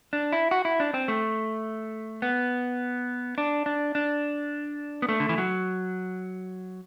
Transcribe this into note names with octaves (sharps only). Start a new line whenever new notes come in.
D4
E4
F#4
E4
D4
C4
A3
B3
D4
D4
D4
B3
A3
D3
E3
F#3